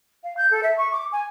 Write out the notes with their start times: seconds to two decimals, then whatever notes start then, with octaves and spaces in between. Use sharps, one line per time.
0.23 F5
0.37 G6
0.51 A4
0.63 E5
0.77 C#6
0.92 D6
1.12 G#5